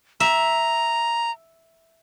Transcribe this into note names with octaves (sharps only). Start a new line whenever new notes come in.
E5 A#5